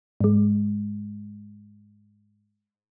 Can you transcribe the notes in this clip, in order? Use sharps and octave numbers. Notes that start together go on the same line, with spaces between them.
G#2 G#3